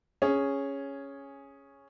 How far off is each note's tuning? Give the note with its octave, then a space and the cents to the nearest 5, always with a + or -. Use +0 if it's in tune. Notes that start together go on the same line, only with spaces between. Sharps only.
C#4 +0 G#4 -5